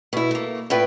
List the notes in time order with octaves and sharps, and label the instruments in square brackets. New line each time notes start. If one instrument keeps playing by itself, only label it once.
[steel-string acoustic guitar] B2 E4
A3 A#3
A2 F4 B4 E5 G5